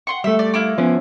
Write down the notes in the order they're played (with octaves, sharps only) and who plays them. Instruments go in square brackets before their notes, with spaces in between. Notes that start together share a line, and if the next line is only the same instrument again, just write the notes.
[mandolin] F#5 C6 C#6
[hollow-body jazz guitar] G3 A3 [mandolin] E5
[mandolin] D5
A#3 E4 D6
[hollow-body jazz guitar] F3 B3 C#4